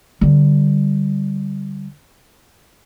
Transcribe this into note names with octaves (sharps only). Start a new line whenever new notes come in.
D3 G3